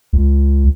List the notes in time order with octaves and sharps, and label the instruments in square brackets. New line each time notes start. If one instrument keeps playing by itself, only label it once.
[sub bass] C#2